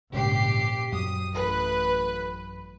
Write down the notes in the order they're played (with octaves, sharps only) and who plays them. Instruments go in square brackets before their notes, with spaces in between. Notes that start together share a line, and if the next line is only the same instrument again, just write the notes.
[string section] A#1 G4 C7 [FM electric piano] G#2 C#3
[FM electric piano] F#2 F#3 [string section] D#6
[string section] A1 B4